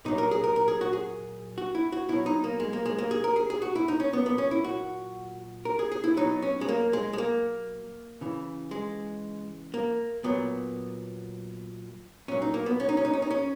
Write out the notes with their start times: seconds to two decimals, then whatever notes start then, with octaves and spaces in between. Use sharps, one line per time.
0.05 A#2 F#3 D#4
0.18 A#4
0.31 G#4
0.44 A#4
0.56 A#4
0.68 G#4
0.81 F#4
0.93 G#4
1.58 F#4
1.75 E4
1.92 F#4
2.09 B2 F#3 E4
2.26 D#4
2.44 A#3
2.60 G#3
2.73 A#3
2.86 G#3
2.98 A#3
3.11 G#4
3.24 A#4
3.36 G#4
3.50 G#4
3.62 F#4
3.75 E4
3.88 D#4
4.00 C#4
4.12 F#3 B3
4.18 A#2
4.26 B3
4.38 C#4
4.51 E4
4.64 F#4
5.65 A#4
5.79 G#4
5.92 G#4
6.04 E4
6.17 B2 F#3 D#4
6.42 C#4
6.61 G#3
6.69 A#3
6.93 G#3
7.13 G#3
7.18 A#3
8.21 C#3 E3
8.71 G#3
9.74 A#3
10.24 A#2 F#3 B3
12.28 A#2 F#3 C#4
12.42 D#4
12.54 A#3
12.66 B3
12.80 C#4
12.89 D#4
12.97 C#4
13.05 D#4
13.13 C#4
13.22 D#4
13.30 C#4